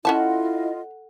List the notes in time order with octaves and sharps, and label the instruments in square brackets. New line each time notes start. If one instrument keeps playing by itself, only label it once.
[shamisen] C#4 E5 A5 [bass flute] E4 [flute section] F4 D#5 [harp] A4 F#5